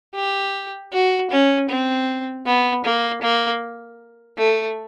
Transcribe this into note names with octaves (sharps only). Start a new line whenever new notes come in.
G4
F#4
C#4
C4
B3
A#3
A#3
A3